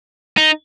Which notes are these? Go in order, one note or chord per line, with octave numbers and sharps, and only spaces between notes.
D#4